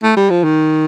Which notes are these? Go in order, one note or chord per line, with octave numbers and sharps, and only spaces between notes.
A3
G3
F3
D#3